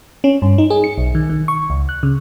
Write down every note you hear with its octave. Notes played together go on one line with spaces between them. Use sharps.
C#4
G2
D#4
G#4
C#7
B1
D#3
D#3
C#6
C#2
F#6
C#3